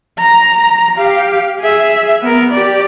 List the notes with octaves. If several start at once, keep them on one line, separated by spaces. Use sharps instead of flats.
A#5
G4 F5
G#4 E5
B3 A#4
G4 D5